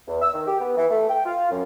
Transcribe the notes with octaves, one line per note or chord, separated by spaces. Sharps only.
E2
E6
D#3
G4
B3
E3
A3
G5
F4
F#2